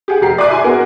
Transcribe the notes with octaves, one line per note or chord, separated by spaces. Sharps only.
G4 G#4 F#5
F1 G4 A#5 C7
D5 E5 G#5 D6 F#6
E4 G#5 C6
B3 F#4 G#4 A#4